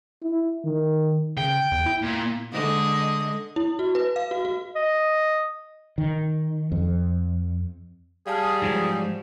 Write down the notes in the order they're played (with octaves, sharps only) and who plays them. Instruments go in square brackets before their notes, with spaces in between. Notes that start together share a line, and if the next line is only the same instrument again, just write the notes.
[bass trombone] E4
D#3
[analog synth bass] C#3 [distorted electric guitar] G5
[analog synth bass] E2
E4
[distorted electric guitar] A#2
[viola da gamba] D3 G#3 D#5
[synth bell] E4
F#4
B4
F5
F#4
F#4
[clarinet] D#5
[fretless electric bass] D#3
F2
[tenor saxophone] G3 [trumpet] G#4 [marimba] F5 A5 F6
[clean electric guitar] G#2 F3 F#3